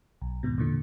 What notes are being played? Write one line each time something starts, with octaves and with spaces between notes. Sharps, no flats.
B1
D#2 G#2 B2
E2 A#2 D3